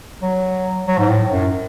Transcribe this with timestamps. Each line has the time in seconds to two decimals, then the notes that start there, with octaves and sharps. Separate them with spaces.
0.22 F#3
0.87 F#3
0.98 G#2
1.09 A2
1.31 F#2